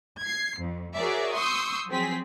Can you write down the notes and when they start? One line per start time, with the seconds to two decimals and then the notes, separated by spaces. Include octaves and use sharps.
0.21 G#6 C7
0.59 F2
0.95 F#4 G#4 A#4 C#5 D5 E5
1.34 C6 C#6 D#6 E6 G6
1.88 F3 F#3 C4 G#4 B6